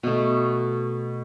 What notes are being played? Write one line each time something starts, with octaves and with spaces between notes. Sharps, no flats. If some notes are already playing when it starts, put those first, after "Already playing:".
B2 A3